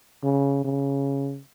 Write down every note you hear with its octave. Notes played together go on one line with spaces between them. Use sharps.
C#3
C#3